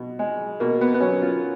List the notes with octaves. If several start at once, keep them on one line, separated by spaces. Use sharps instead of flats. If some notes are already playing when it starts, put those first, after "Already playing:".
Already playing: B2
G#3
B2 A#3
B3
B3
F#3 C#4
F4